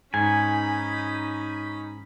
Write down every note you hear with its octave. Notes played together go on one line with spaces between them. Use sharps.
G#2 C#4 D#4 G#5 B5